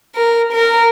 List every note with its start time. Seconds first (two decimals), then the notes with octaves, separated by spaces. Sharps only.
0.16 A#4
0.53 A#4